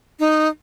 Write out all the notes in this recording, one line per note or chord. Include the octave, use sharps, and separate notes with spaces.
D#4